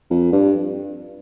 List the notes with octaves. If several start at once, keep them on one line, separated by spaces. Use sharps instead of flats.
F2
G2